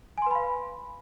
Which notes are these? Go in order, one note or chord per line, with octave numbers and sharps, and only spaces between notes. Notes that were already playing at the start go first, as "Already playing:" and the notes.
B4 F5 G#5 B5 C6